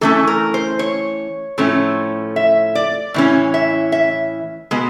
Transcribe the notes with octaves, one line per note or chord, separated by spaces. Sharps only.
E3 A3 C#4 A4
A#4
C5
C#5
A2 F3 A3 C#4
E5
D5
A2 E3 C#4
E5
E5
B2 G#3 B3